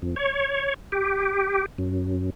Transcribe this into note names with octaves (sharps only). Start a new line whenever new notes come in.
F2
C#5
G4
F#2